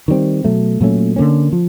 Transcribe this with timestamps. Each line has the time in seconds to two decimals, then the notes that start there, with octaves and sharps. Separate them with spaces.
0.08 D#3 G3 C4
0.44 B2 F#3 A3
0.81 A#2 F#3 A3 C#4
1.16 D3 F#3 A#3 C#4
1.53 F3